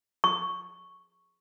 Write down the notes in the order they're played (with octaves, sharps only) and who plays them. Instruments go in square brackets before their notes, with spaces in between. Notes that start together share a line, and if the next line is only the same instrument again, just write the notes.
[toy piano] C#6